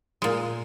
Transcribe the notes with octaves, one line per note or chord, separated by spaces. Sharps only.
A#2 G#3